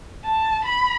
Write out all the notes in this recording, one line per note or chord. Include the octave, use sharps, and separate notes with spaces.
A5
B5